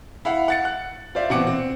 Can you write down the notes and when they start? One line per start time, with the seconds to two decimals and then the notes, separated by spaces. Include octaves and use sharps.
0.25 E4 F5 F#5
0.48 F#5 A6 C#7
0.65 F#6
1.15 F4 C5 D5 E5
1.30 B2 E3 C4 F#5 D6 C#7
1.47 C4